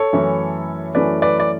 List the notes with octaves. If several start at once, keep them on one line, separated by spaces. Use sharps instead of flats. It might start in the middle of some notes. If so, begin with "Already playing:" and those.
Already playing: A4 C#5
F#2 E3 A3 C#4 E4
F#2 E3 A3 C#4 E4 B4 D5
B4 D5
D5